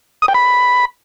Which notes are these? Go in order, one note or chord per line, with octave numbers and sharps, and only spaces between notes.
D#6
G5
B5